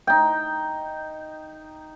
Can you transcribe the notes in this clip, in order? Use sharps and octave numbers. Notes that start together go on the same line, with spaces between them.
D#4 G5